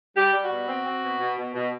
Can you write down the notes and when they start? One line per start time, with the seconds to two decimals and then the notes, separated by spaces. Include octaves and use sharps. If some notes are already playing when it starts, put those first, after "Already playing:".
0.16 G3 G4
0.33 G3
0.43 F#4
0.51 B2
0.68 C4
0.86 C4
1.03 B2
1.20 B2
1.37 B2
1.55 B2